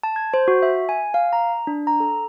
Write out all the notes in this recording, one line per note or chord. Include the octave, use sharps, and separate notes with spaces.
A5
G#6
C5
F#4
E5
G#5
F5
A#5
D4
A#5
A4